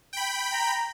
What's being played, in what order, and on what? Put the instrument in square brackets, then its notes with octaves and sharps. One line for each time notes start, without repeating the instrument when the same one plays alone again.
[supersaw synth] G5 B5
[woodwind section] A#5